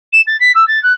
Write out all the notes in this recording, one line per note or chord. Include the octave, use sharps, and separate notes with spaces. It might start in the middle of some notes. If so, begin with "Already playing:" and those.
E7
A6
B6
E6
A6
F#6